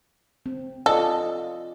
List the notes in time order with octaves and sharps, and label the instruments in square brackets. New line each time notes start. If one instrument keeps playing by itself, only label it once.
[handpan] C4
[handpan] F4 D5 D#5 [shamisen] A4